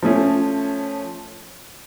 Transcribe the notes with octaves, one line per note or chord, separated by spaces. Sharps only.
F3 A3 C#4